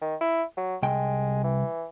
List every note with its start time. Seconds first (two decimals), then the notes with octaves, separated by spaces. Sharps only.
0.01 D#3
0.21 E4
0.57 F#3
0.83 C2 G#3 G5
1.44 E3